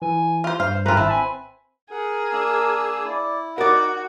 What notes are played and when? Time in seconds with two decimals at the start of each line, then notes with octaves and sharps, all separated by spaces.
0.02 E3 G#5
0.44 F4 C5
0.60 G2 C5 F5
0.86 E3 C4 F4 B4 A#5
0.97 G#1 E4 A5
1.10 G#5 B5
1.91 G#4 A#4 F#5
2.32 A#3 D4 E6
3.04 E4 D5
3.58 D#4 F#4 A#4 D5